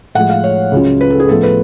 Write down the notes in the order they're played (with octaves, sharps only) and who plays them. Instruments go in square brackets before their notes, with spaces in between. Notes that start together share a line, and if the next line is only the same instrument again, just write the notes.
[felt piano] A2 F3 G#3 F#5
F5
C#5
C#2 C#3 F#3 C#4 F4
B4
A4
G#4
A2 F3 B3 A4
B4